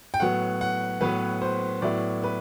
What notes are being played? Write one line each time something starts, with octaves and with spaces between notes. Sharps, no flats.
G5
A2 F#3 B3 F#5
F#5
A2 F#3 B3 B4
C5
A2 F#3 B3 E4 D5
B4